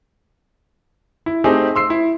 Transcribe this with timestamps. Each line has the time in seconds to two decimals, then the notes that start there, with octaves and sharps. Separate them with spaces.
1.26 E4
1.44 A3 C4 D#4 G4 G#4
1.76 C6 E6 C7
1.90 E4